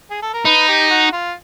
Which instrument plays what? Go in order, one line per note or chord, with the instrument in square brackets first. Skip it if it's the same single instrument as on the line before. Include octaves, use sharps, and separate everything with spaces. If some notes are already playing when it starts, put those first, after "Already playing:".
[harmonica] G#4
A4
A#4
[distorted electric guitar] D#4 [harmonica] B4
[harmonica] G4
F#4
F4